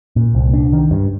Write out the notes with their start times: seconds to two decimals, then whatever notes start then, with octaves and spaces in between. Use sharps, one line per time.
0.16 A#2
0.35 C2
0.54 D4
0.73 D#3
0.91 G2